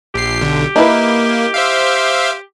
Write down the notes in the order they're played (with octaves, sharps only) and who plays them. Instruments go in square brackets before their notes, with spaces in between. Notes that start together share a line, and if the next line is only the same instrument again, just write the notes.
[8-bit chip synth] A#1 C7 [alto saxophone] G4
[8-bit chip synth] B1 D3
[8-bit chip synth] A#3 [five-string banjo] D#4 E4 B4
[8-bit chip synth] C5 E5 F5